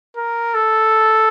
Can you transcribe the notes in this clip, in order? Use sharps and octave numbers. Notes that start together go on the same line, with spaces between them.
A#4
A4